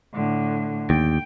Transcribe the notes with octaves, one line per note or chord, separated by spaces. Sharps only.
A2 D3
D#2 G5